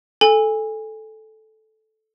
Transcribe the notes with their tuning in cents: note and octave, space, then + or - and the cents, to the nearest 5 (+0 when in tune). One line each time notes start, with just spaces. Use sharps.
A4 -10 G#5 -20